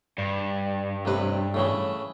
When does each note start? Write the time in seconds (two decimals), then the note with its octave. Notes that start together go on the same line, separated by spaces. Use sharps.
0.18 G2
1.05 A1 C3 B4
1.54 A2 C#3 E3